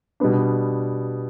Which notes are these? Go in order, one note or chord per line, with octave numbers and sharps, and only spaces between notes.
B2 G3 B3 D4